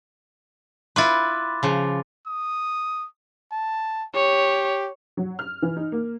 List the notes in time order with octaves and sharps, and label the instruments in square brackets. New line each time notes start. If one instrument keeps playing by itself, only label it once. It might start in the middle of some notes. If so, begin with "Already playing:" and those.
[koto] E4 F4 B4 [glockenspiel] C6 D6 A6
[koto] C#3 F3
[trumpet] D#6
A5
[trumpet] G4 [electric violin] C#5
[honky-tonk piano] F#3
F6
E3
D#4
A#3